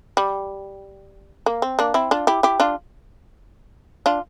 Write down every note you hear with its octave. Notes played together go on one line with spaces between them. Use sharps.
G3
A#3
C4
A#3 D4
C4 E4
D4 F4
E4 G4
E4 G4
D4 F4
D4 F4